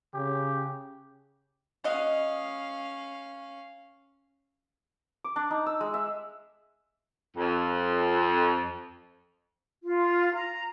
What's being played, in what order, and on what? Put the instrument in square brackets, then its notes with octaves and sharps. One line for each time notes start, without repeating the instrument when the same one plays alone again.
[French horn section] C#3 [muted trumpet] G4
[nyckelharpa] C#4 F5 [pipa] F#4 D#5
[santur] D6
D4
D#4
E6
G#3
E5
[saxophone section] F2
[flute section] F4
A#5